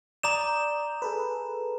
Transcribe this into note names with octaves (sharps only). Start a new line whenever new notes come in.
D5 A#5 D#6 G6 E7
G#4 A4 B4